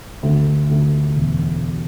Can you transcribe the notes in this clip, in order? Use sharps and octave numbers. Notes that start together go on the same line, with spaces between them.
D2
D2
E1